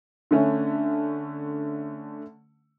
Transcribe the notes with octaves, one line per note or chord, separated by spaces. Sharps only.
D3 A3 C#4